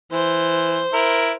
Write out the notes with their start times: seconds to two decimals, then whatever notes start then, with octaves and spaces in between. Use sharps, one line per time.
0.12 E3 C5
0.93 E4 A#4